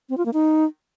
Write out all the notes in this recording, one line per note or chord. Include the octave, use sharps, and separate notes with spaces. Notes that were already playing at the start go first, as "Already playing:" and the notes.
C4
F4
A#3
D#4